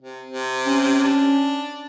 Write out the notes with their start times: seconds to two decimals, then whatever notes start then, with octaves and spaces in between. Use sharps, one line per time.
0.02 C3
0.28 C3
0.67 C#4
1.04 D4